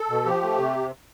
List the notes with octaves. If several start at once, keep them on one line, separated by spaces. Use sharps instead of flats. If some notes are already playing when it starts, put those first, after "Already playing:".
Already playing: A4
B2
F3 G4
A3
C3